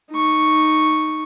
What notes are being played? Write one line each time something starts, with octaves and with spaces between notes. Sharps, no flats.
D#4 C#6